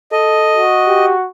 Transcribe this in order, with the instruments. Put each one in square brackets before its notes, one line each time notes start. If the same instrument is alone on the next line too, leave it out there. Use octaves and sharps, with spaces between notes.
[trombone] A4 [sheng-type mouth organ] D#5
[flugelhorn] F#4
[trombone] G4